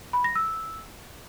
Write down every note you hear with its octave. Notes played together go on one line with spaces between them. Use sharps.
B5
A#6
E6